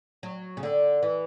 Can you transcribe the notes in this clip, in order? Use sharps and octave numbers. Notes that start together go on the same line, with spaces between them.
F#3
C#3
D3
E3